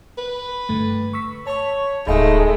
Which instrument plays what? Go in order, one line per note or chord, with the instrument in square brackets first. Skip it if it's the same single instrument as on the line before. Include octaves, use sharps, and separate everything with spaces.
[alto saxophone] B4
[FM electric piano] G2 D3 A3
C#6 E6 B6
[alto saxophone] C#5 [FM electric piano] A5 C#6
[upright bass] D1 [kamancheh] G#3 A3 [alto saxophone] D#4 [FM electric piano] F5 B5